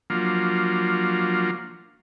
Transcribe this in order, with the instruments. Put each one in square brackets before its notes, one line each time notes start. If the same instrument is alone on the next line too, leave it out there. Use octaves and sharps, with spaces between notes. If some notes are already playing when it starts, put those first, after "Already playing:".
[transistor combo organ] F3 F#3 A#3 D4 F4